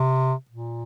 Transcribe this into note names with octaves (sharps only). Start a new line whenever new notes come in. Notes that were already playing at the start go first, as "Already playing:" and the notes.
Already playing: C3
A#2